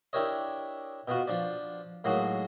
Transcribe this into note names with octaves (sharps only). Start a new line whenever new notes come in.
D4 E4 G4 A#4 C#5 D#5
B2 B3 F4 F#4
F3 D4 D5
A2 F#3 G#3 A#3 D#4 F#4